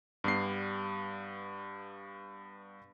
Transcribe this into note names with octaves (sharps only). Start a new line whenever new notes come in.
G2 G3 B3 C7